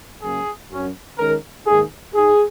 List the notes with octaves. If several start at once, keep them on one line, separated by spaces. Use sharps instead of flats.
F#2 C#3 A#3 G#4
F#2 F#3 C#4
D#3 G#3 C#4 A#4
G#2 D#3 A#3 D#4 G#4
G#2 G#3 D#4 G#4